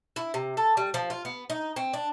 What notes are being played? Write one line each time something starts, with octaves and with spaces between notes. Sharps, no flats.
E4
C3
A4
G3
F3
F4
B3
D#4
C4
D4